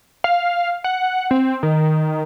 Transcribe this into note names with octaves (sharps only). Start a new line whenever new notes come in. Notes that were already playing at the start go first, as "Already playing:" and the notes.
F5
F#5
C4
D#3